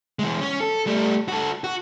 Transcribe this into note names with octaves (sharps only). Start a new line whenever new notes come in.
E3 G#3
C#4
A4
G3 A3
F#4 A4
F#4